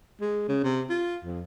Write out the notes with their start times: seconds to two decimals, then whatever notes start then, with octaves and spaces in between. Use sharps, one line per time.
0.21 G#3
0.48 C#3
0.64 C3
0.90 F4
1.24 F2